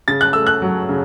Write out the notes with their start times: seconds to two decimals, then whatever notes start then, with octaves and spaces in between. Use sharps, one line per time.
0.08 C#3 A6
0.21 F#6
0.33 A3 E6
0.47 F#6
0.62 F#3
0.89 C#3